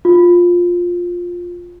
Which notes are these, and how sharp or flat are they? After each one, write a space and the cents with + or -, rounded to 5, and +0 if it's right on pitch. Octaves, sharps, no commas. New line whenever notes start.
F4 +10